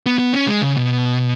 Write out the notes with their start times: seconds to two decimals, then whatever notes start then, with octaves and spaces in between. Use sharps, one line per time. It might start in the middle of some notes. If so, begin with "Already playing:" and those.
0.06 B3
0.19 B3
0.33 C#4
0.47 G#3
0.62 C#3
0.77 B2